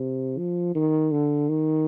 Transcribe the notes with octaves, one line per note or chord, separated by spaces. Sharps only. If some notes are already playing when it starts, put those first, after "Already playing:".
Already playing: C3
F3
D#3
D3
D#3